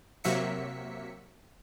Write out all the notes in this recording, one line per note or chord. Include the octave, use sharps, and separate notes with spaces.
C3 F#3 A#3 E5 B6 C#7